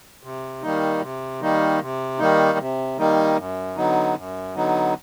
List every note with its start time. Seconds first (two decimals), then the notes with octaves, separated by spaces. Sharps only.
0.23 C3
0.62 D#3 G3 A#3 D#4
1.01 C3
1.41 D#3 G3 A#3 D#4
1.81 C3
2.19 D#3 G3 A#3 D#4
2.58 C3
2.98 D#3 G3 A#3 D#4
3.37 F#2
3.76 D3 F#3 B3 D#4
4.16 F#2
4.55 D3 F#3 B3 D#4